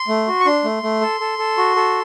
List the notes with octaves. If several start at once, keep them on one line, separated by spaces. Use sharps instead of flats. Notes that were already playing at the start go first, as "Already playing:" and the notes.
Already playing: C6
A3
F#4
C#6
D4 C6
A3
A3
A4
A4
A4
F#4
A4